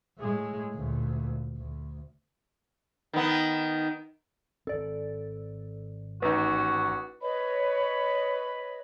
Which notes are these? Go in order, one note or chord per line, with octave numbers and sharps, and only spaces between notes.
A2 G#3
D2 A#2
D2
D#3 B3
G#1 C4 A4 D5
A1 D#4 F#4 B4
B4 C#5 D#5 B5